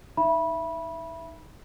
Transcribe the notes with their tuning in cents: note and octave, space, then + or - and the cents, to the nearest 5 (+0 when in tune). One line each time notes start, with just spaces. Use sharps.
D#4 +0 E5 +15 B5 -20